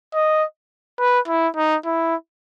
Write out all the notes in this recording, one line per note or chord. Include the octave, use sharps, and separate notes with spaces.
D#5
B4
E4
D#4
E4